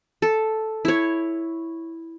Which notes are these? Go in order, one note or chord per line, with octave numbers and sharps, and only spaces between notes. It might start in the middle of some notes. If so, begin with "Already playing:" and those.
A4
E4 C#5